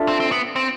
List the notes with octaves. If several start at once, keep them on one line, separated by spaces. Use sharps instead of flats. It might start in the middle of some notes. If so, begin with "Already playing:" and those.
Already playing: D4 F4 A4 E5
C4
C4
B3
C4